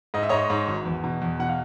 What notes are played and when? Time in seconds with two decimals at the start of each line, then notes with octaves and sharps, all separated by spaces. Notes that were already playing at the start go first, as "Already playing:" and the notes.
0.14 G#2 D#5
0.23 E5
0.29 G#2 C#5 D#5
0.50 G#2
0.68 G#1
0.85 E2
1.04 B2
1.22 E2
1.39 B2 F#5
1.49 F5